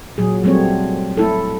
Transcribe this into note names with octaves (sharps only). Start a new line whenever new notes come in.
A#2 F#3 G#4
F#3 G3 A3 C4 C#5
A3 E4 A4